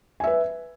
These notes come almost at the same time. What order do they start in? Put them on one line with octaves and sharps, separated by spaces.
G#5 E5 B4